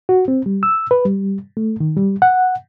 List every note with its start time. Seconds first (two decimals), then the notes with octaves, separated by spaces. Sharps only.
0.09 F#4
0.28 C4
0.46 G3
0.63 E6
0.91 B4
1.06 G3
1.57 A3
1.80 D#3
1.97 G3
2.22 F#5